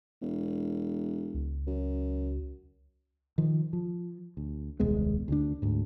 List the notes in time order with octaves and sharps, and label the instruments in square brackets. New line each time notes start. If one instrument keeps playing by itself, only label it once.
[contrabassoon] E1
[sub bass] C#2
[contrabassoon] F#2
[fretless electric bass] D#3 F3
F3
D2
D#1 C2 G#3 B3
D2 D3 D4
D2 G#2